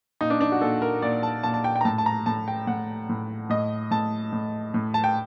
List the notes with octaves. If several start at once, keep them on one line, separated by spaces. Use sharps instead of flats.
A#2 D#4
D4
D4
F#4
A#2 A4
A#4
A#2 D5
A5
A#2 A5
A5
G5
G5
A#5
A2 A5
A5
A#5
A2 A5
G5
A2 F#5
A2
A2 D#5
A2 A5
A2
A2
A5
G5